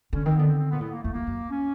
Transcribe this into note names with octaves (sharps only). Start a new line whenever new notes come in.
D3 C#4
D#3 C4
D3 B3
C4
C4
B3
A#2
A2 B3
A#3
F2 A3
F2 A#3
F#2
C#4